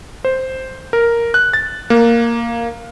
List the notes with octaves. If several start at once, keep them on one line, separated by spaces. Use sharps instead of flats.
C5
A#4
F#6
A6
A#3